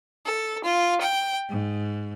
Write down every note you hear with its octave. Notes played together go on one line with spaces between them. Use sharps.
A4
F4
G5
G#2